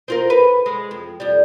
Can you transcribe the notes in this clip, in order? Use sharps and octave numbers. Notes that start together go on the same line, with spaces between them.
C4 F4 A#4
B4
G#3
F2
F2 G3